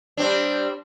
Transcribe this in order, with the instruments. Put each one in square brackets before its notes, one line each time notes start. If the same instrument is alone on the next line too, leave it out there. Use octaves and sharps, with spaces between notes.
[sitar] G3 C4 D4